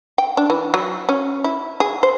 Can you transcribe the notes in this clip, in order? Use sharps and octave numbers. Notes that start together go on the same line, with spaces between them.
G5
D4
E3
F#3
C#4
E4
G#4
C5